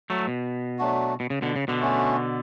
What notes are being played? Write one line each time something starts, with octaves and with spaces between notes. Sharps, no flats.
F#3 A3
B2
F#3 A3 D4 F#4
B2
C#3
B2 D3
C#3
B2 D3
A3 C#4 F#4